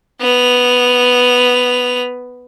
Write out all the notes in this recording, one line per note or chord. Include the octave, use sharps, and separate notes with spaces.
B3 F7